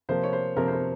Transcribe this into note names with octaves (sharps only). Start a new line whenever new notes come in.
C3 F3 A#3 C5
C#5
C5
C3 F3 A#3 A#4
C5
A#4